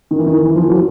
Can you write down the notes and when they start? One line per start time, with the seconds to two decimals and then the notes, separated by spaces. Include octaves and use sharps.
0.11 D#3
0.19 E3
0.26 D#3
0.46 E3
0.56 F3
0.69 F#3